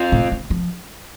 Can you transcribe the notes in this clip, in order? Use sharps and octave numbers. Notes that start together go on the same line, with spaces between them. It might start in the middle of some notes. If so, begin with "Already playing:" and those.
Already playing: C4 F4
A2
D3
F3